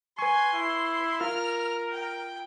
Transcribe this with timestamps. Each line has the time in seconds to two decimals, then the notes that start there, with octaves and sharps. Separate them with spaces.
0.19 B4 G#5 C6 C#6
0.53 E4
1.21 F4 A#4 F6
1.92 G5